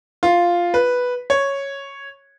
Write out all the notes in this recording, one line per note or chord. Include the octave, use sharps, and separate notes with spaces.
F4
B4
C#5